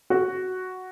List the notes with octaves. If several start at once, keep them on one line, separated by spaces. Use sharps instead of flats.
F#4